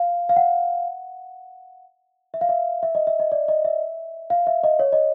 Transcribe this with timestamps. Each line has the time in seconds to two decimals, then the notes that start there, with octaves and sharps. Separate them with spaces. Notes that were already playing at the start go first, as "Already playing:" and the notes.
Already playing: F5
0.29 F5
0.36 F#5
2.34 E5
2.41 F5
2.49 E5
2.83 E5
2.95 D#5
3.07 E5
3.20 D#5
3.32 D5
3.48 D#5
3.64 E5
4.30 F5
4.47 E5
4.64 D#5
4.79 C#5
4.92 D#5